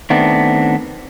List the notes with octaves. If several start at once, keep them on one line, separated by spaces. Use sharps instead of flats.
D#3 A3 B3 C4 D4